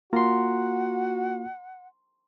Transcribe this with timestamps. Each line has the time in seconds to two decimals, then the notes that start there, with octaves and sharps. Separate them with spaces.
0.13 A#3 F4 F#4 F#5 A#5 C6